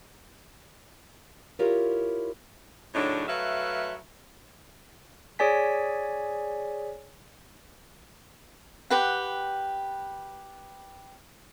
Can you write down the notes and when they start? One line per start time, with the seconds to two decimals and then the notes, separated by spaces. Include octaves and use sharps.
1.59 E4 F4 G4 A#4 C#5
2.95 A2 C#3 F#3 D4 D#4
3.29 F#3 A3 B4 E5 F5
5.39 G#4 C#5 D5 G#5 B6
8.90 G4 B4 F#5